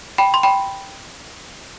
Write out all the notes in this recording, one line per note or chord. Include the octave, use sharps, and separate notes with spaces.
G5 B5
C6
G5 B5